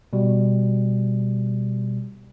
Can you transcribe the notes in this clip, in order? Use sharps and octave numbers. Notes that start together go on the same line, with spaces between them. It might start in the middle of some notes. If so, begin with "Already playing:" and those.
B2 G3